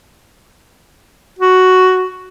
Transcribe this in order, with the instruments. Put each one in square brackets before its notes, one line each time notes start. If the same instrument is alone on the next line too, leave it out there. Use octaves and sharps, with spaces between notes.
[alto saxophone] F#4